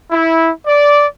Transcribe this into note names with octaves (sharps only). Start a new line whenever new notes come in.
E4
D5